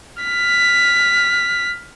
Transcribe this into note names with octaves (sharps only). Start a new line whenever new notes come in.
F6 B6